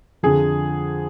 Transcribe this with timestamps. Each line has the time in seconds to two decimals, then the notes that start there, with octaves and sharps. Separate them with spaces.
0.23 F2 D3 F3 G#4